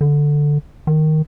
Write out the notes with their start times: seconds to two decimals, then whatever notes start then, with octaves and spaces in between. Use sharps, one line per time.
0.01 D3
0.87 D#3